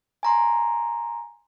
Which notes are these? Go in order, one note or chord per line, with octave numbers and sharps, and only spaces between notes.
G#5 A#5 C6